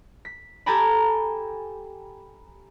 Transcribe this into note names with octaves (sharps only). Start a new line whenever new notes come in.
B6
G4 A4 G5 G#5 A#5 B5